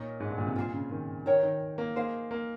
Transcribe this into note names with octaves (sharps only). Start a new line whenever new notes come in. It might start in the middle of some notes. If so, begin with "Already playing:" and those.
Already playing: A#2 D#4 A#4 C#5
G#2
G2
A#2
C3
A#2 F4 G#4 C5
C#3
D#3
D#3 A#4 C#5 G5 A#5
D#3
A#3
A#3 D#4 G#4 C5 F5
A#3